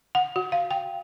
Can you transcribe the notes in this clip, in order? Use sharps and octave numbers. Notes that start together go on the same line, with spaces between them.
F#5
F#4
F5
G5